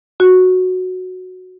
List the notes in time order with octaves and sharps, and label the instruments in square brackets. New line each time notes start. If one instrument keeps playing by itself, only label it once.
[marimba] F#4